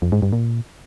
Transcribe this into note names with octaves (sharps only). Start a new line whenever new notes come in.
F2
G#2
G2
A#2